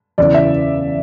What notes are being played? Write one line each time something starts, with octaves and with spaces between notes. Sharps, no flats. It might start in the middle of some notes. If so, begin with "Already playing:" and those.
E2 C#3 E3 D5
E5